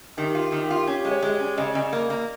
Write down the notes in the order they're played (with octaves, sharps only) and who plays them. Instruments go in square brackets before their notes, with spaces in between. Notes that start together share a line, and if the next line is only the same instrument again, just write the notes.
[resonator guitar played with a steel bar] D#3 [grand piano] G4
[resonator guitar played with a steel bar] F4
D#3
[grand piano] G4
[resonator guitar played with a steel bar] F4
[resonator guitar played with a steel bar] C#4 [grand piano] G4
[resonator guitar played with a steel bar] G#3
[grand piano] C#5
[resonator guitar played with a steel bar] G#3
[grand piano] D5
[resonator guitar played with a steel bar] C#4
[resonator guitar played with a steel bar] C#3 [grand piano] D#5
[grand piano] D5
[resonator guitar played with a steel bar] C#3 [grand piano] D#5
[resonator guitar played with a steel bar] A#3
A#3